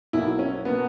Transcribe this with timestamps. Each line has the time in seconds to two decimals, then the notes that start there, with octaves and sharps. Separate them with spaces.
0.13 B1 B2 A#3 E4
0.39 C#4
0.65 B2 A#3 B3